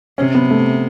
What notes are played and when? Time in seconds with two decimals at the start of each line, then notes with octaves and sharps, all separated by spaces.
0.18 C3 C#4
0.35 B3
0.51 A3